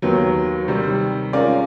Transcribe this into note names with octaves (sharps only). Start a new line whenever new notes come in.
D#2 D#3 F#3 B3
C3 D#3 G3
G#3 C#4 F4 A#4 D5